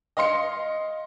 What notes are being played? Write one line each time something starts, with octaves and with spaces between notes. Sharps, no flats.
D#5 F5 C6 C#7